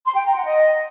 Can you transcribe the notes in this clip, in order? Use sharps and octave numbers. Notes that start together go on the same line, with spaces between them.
C6
G5
A#5
F#5
D#5